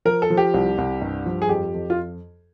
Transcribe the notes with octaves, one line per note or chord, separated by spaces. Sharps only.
F3 A#4
A4
F3
G4
C2
C2
G2
F3
G#4
F2 G4
F2
F4